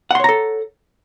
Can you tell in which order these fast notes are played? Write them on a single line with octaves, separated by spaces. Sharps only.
F#5 C6 C#5 A#5 A4